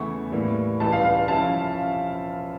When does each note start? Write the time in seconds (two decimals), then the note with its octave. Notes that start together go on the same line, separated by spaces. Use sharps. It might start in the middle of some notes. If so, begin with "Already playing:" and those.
Already playing: E2 C#3 E3 A3 E4 C#6
0.32 A2 E3 G3 A#3
0.80 C#2 C#3 E3 G3 A5
0.92 F5
1.04 F5
1.28 F3 C#4 E4 A5